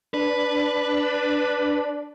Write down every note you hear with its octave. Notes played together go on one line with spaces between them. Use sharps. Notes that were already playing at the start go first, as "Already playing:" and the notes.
D4 B4